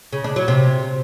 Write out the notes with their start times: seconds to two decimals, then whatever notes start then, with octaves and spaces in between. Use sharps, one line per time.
0.13 C#3
0.24 D4
0.36 F#3
0.48 C3